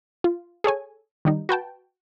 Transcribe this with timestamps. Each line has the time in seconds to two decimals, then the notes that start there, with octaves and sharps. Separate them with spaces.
0.24 F4
0.64 G#4 A4 C#5 G#5
1.25 D#3 G3 D#4
1.49 F#4 B4 G5 A5